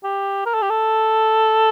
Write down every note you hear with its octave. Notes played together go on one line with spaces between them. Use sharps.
G4
A#4
A4
G4
A4